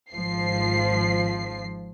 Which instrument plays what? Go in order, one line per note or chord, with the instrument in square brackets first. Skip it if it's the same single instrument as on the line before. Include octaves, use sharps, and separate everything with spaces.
[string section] G#1 F3 C7